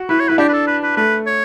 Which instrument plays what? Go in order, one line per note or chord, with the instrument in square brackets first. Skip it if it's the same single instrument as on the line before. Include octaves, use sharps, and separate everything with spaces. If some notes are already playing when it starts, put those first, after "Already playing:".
Already playing: [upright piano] F#4
[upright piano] E4 [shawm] B4
[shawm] C#5
[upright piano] E4 [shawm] B4
[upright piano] D4 [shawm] G4
[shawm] B4
A4
B4
B4
[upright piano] A3 [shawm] B4
[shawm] C#5